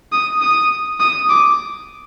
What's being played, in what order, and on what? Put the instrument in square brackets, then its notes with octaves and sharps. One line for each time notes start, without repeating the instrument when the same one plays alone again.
[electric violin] D#6
D#6
D#6
D6